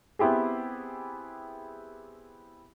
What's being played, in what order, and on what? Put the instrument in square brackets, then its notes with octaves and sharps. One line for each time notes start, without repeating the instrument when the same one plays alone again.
[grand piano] B3 C4 E4 G4 G#4